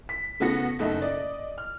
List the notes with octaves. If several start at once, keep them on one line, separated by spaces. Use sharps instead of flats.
B6
C#3 A3 B3 F#4 A#6 C#7
F#1 A3 D#4 D#5 E5
D5 D#5
F6